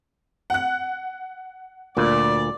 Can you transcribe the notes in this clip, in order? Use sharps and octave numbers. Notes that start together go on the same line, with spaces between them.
F#5 F#6
D2 A#2 D5